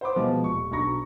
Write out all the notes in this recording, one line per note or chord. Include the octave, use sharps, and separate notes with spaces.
C5 F#5 B5 C6 D6
B2 F3 G#3 B3
D#1 C#6
B1 D4 A#5 B5 C#6 A#6